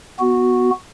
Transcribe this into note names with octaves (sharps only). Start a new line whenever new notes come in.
B3 F#4